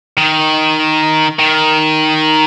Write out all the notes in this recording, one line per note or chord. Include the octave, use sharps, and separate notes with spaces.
D#3
D#3